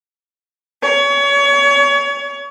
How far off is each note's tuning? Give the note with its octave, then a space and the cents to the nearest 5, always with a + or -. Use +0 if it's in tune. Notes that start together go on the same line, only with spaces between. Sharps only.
C#5 +30